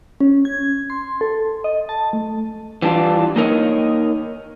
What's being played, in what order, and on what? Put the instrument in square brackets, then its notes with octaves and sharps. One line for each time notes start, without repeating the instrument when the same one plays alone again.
[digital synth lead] C#4
G#6
C6
A4
D#5
A5
A3
[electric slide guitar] E3 G3 D4 F4
A#3 D#4 A#4 C#5 D#5